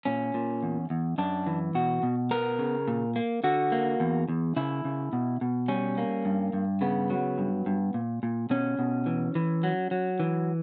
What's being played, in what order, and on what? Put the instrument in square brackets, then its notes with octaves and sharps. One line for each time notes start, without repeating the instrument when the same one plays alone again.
[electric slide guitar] A#2 C#4
A#2
E2
E2
F#2 D4
E3
B2 F#4
B2
B3 A#4
C#3
A#2
A#3
D3 F#4
A#3
E2
E2
C#3 E4
C#3
B2
B2
G3 C#4
A#3
G2
G2
C#3 B3
F#3
G2
G2
A#2
A#2
B2 C#4
B2
E3
E3
F#3
F#3
E3